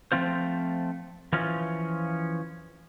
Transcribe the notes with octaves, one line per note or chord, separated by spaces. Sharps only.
F3 A3 C4 F4 C5
E3 F3 C#4 F4